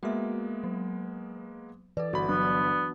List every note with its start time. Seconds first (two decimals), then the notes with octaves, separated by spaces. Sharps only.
0.03 G#3 A#3 B3 F#4 E5
0.64 F#3
1.97 E3 A4 B4 D5
2.13 G1 F#4 B5
2.29 F#3 B3 D4